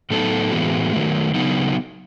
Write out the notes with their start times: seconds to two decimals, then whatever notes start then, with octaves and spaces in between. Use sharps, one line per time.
0.10 A2 F#3 B3 D#4 A4
0.51 A2 E3 G#3 B3 F#4
0.93 D#3 F#3 A3
1.34 C#3 F#3 B3 D#4